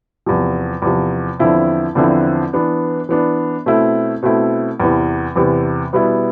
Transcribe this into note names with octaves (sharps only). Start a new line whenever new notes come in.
E2 C3 F3
E2 C3 F3
E2 D3 F3 C4 E4
E2 D3 F3 C4 E4
E3 B3 D4
E3 B3 D4
B2 A3 C4 E4
B2 A3 C4 E4
E2 C3 E3
E2 C3 E3
B2 G3 B3 E4